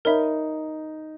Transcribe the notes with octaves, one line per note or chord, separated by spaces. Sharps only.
D#4 A#4 C#5 E5 B5